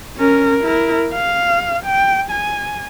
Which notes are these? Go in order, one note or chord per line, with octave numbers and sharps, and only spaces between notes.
C#4 A#4
E4 A#4
F5
G5
G#5